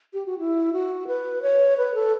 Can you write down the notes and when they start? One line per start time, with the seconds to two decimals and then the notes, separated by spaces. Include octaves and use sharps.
0.14 G4
0.26 F#4
0.39 E4
0.73 F#4
1.07 B4
1.42 C#5
1.77 B4
1.94 A4